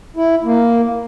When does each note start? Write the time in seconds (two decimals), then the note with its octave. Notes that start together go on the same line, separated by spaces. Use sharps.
0.16 E4
0.44 A#3